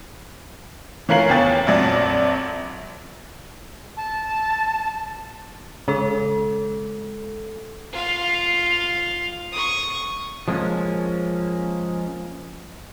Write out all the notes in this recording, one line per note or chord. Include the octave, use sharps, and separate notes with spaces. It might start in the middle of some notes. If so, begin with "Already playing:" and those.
E3 C#4 F4 A#4 C7 F#7
E2 C#3 C#4 G5 A6
A#1 F2 F#3 D5
A5
C#3 G#3 A4
F4 F5
C#6 D#6
F3 G#3 A#3 B3 C#4